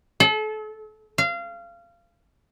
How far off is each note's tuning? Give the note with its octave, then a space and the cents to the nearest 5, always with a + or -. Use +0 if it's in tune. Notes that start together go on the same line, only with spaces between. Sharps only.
A4 -35
F5 -25